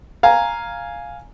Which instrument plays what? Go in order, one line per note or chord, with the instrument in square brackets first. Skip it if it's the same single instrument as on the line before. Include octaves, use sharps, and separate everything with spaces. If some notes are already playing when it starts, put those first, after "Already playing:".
[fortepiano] F5 G#5 A#5